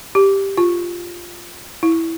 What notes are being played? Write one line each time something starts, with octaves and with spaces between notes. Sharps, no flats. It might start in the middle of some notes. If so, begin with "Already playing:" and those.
G4
F4
E4